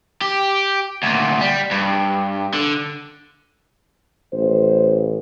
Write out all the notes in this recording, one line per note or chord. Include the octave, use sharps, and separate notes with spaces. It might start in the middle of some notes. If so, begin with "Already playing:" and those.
G4
D2 A#2
G3
G2
D3
A1 C5